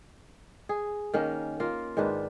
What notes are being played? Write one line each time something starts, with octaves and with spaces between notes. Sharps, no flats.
G#4
D#3 A#3 C#4
A#3 F4
G#2 D#3 D4 B4